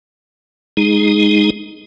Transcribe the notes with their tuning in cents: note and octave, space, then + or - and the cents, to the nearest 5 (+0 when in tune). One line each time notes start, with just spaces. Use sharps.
G#3 +0 D#4 +0 G#4 +0